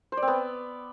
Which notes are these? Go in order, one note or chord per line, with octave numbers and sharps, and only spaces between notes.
C5
D5
C4
B3